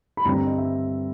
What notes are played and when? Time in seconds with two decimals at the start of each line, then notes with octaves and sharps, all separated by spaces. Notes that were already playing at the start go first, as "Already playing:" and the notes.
0.17 B5
0.25 G2 D3 G3 C4 A#5
0.46 D#5
0.58 E5